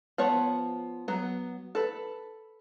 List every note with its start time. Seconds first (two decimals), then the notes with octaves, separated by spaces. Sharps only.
0.18 F3 B3 C#5
1.08 F#3 B3
1.75 A4 B4